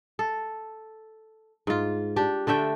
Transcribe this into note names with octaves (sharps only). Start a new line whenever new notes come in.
A4
G#2 F4
D4 G4
D3 A3 E5 G5